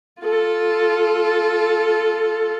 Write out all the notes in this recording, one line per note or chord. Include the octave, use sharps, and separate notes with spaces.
F4 A4